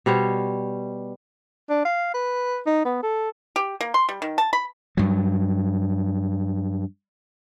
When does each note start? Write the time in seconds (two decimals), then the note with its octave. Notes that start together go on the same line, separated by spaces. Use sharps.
0.06 B2 G3 C5 C#5
1.70 D4
1.85 F5
2.14 B4
2.67 D#4
2.85 B3
3.03 A4
3.56 G4
3.81 A#3
3.94 C6
4.09 G3
4.22 D#3
4.38 A5
4.53 B5
4.97 G2 F#3